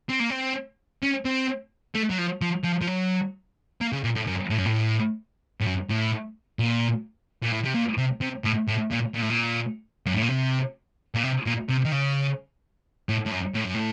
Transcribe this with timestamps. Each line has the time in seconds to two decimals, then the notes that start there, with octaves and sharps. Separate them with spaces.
0.09 C4
0.19 A#3
0.30 C4
1.02 C#4
1.25 C4
1.95 A3
2.10 F#3
2.18 F3
2.41 F3
2.64 F3
2.82 F3
2.87 F#3
3.81 A#3
3.92 C#3
4.04 A#2
4.15 A2
4.27 F#2
4.50 A2
4.58 F#2
4.65 A2
5.60 A2
5.66 F#2
5.89 A2
6.59 A#2
7.43 A#2
7.52 A2
7.65 C3
7.75 A#2
7.98 C3
8.21 C3
8.44 A2
8.67 A2
8.91 A#2
9.14 A#2
9.22 A2
9.30 A#2
10.06 F#2
10.14 A2
10.22 A#2
10.29 C3
11.15 A#2
11.23 C3
11.46 A#2
11.69 C3
11.85 D#3
11.92 C#3
13.09 A2
13.26 A2
13.32 F#2
13.55 A2
13.65 F#2
13.74 A2